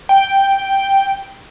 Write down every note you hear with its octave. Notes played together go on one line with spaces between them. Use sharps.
G5